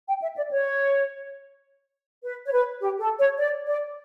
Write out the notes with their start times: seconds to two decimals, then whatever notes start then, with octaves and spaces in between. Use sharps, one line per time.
0.08 G5
0.22 E5
0.37 D5
0.51 C#5
2.24 B4
2.47 C#5
2.52 B4
2.81 G4
3.00 A4
3.19 C#5
3.38 D5
3.67 D5